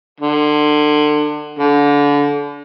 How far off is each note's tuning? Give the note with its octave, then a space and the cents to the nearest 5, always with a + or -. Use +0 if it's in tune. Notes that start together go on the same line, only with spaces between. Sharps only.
D3 +30
D3 -30